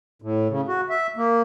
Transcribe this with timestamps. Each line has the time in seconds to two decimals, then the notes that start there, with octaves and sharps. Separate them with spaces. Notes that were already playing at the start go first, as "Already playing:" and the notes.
0.22 A2
0.49 C#3
0.68 F#4
0.89 E5
1.16 A#3